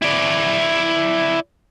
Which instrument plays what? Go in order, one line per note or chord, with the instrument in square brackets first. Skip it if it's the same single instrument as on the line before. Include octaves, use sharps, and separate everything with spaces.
[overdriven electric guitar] E4 D5